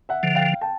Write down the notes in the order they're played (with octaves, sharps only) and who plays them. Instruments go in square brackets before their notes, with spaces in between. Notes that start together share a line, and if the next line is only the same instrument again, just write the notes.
[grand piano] E5 F#5
[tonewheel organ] D3 F3
[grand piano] F5 G5
G5 A5